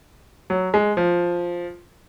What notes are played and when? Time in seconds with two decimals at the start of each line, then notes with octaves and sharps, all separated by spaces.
0.50 F#3
0.74 G#3
0.97 F3